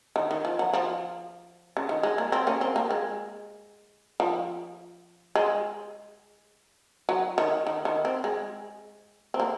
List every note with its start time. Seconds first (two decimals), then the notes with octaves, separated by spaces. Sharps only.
0.16 D#3
0.31 D#3
0.45 F3
0.59 F#3
0.73 F3
1.77 C#3
1.89 D#3
2.03 G#3
2.18 A#3
2.32 C4
2.47 A#3 C#4
2.61 C4
2.76 A#3
2.91 G#3
4.20 F3
5.35 G#3
7.09 F#3
7.38 D#3
7.67 D#3
7.85 D#3
8.05 C4
8.24 G#3
9.34 C4
9.40 A#3